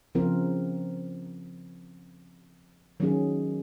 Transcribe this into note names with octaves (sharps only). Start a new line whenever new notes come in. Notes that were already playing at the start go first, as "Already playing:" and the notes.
C#3 F3 C4 F4 A#4
D#3 F#3 C#4 G#4